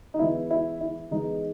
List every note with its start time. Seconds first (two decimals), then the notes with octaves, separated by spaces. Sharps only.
0.14 D#4
0.19 E3 G#3 B3 E4
0.51 E4
0.81 E4
1.11 E3 G#3 B3 D#4